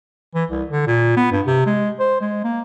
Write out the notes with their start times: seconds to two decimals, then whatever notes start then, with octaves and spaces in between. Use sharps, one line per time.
0.34 E3
0.50 C2
0.70 D3
0.87 A#2
1.17 B3
1.32 G2
1.46 C3
1.66 G#3
1.99 C5
2.21 G#3
2.44 A#3